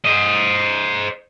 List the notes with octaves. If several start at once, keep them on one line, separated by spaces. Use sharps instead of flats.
C5 D#5